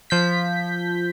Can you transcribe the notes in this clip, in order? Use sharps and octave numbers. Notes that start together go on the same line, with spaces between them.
F3 G6 B6